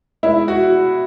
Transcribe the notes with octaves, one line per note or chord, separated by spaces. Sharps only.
G#3 E4
F#4